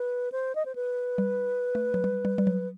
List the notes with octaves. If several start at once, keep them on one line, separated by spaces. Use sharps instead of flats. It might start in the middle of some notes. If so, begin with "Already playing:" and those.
Already playing: B4
C5
D#5
C5
B4
G3
A3
F#3
G3
G3
G3
F#3